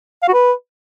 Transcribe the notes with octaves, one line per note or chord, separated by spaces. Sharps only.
F5
F#4
B4